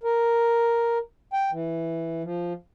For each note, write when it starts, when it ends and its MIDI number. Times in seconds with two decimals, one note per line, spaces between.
0.04 0.98 70
1.33 1.51 79
1.52 2.23 52
2.23 2.53 53